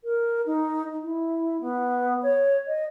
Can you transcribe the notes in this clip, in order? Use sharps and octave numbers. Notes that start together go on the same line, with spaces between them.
A#4
D#4
E4
B3
C#5
D#5